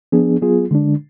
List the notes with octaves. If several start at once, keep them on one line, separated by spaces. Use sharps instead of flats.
F3 B3 D4 G#4
F#3 B3 F4 G#4
D3 G#3 D4